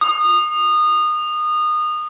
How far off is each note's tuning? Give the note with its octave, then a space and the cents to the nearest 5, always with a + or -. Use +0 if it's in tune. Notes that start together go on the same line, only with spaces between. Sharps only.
D#6 -25